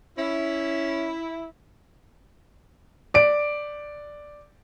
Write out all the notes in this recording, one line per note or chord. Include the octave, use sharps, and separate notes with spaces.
C#4 E4
D5 D7